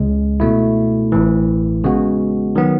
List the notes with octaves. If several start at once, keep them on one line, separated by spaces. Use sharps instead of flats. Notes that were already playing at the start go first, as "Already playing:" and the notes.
Already playing: C#2 C#3 G#3
B2 A3 E4
A1 A2 E3
C#3 G#3 B3 F#4
D#3 F#3 B3